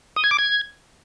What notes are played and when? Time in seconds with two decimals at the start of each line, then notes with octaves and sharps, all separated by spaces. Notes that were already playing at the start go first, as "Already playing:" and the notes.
0.16 D#6
0.24 G#6
0.31 D6
0.39 G#6